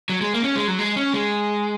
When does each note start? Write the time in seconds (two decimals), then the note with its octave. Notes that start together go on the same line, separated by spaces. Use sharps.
0.09 F#3
0.21 G#3
0.34 A#3
0.44 C#4
0.56 G#3
0.68 F#3
0.79 G#3
0.96 C#4
1.14 G#3